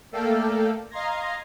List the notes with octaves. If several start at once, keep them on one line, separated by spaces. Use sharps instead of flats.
A3 A#3 A4 D5 F5 G5
D#5 F5 A#5 C6 G#6 A#6